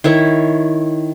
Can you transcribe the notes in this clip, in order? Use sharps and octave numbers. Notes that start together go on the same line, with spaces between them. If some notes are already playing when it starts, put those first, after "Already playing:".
D#3 E4 C#5